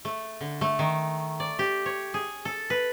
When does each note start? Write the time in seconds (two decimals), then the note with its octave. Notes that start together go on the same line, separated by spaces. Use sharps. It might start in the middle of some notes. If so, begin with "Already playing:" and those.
0.05 A3
0.41 D3
0.61 A3
0.79 D#3
1.40 D5
1.59 G4
1.86 C#5
2.14 G#4
2.45 A4
2.70 B4